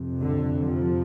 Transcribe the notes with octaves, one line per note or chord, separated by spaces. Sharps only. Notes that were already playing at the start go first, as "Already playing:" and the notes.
Already playing: F2 C3
D3
F3